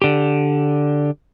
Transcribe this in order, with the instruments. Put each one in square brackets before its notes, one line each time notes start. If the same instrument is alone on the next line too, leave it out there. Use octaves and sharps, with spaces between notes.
[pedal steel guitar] D3 G4